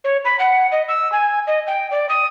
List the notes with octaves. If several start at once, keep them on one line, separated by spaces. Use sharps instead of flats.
C#5
B5
F#5
D#5
E6
G#5
D#5
G5
D5
D#6